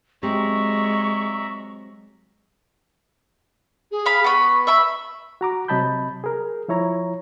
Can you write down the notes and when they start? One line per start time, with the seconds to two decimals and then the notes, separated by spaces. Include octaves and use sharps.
0.23 F#3 G#3 C4 G4 D5 E5 A#5 C#6
3.91 G#4
4.06 F5 B5
4.24 B3 B5 C#6
4.67 E5 B5
5.41 F#4 A#5 D6
5.68 C3 F#3 D#5 A5 B5 G6
6.24 G#4 A#4
6.68 F3 E4 C#5 A#5